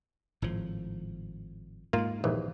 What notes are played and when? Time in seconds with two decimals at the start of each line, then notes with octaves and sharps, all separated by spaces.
0.42 G#1 A2 F3
1.93 G#2 G#3 A#3 F4
2.24 A#1 D#2 E3